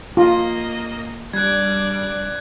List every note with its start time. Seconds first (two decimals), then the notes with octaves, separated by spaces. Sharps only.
0.17 A#3 F4 D#5
1.33 G3 D4 D5 F#6 G#6